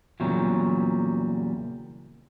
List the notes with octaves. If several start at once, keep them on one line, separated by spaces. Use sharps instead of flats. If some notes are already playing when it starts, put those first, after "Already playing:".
E2 A#2 C#3 F#3 G3